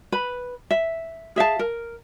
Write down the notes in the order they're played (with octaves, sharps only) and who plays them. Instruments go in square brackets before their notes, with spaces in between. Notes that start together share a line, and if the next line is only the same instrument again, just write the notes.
[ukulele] B4 B5
E5
G#4 E5 F5 A5
A#4